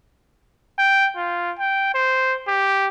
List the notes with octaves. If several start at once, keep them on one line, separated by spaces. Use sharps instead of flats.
G5
F4
G5
C5
G4